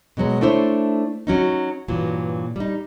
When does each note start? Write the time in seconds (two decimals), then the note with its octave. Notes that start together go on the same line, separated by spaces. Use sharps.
0.17 B2 D3 F#3 G#3
0.41 A3 D4 E4 C5 C#5
1.27 F#3 C#4 D#4
1.88 G2 A#2 E3 F#3
2.56 G3 D#4